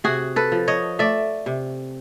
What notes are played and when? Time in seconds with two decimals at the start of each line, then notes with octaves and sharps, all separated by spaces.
0.04 C3 F#4 G#4
0.36 A4 B4
0.52 F3
0.68 C#5 D#5
0.99 A3 D5 E5
1.46 C3